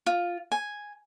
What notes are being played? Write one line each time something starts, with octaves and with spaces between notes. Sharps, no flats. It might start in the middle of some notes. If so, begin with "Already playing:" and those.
F4
G#5